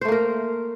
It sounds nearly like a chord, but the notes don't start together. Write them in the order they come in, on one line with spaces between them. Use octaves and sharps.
C5 A3 A#3 A#4